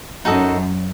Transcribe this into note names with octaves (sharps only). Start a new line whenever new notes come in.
F#2 D#4 F#4 A4 D#5